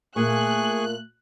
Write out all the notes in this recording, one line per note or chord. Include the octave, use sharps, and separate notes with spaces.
A#2 A3 A#3 G#4 G#5 C#6 F#6